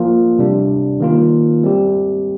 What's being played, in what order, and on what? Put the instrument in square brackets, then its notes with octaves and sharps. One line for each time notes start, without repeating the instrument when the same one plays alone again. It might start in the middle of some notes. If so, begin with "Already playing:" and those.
Already playing: [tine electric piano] F3 A#3 F4
C3 G3 D4
D#3 A#3 F4
G3 C4 G4